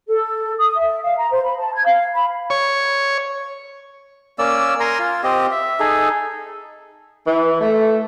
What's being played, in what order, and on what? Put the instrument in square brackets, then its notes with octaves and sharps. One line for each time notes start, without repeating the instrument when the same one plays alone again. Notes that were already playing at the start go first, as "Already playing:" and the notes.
[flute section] A4
D#6
E5
F5
A#5
C5
B5
A5
G#6
F5
B5
[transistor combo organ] C#5
[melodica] A#3 C#4 D5 E6
A#4 G#5 A#5 C6
F4
C4 G4 D#5
E5
D#4 G#4 A4
[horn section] E3
A3